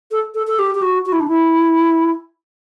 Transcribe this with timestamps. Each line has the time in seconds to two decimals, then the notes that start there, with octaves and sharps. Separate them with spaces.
0.12 A4
0.35 A4
0.47 A4
0.59 G4
0.75 G4
0.82 F#4
1.06 F#4
1.12 E4
1.20 D4
1.28 E4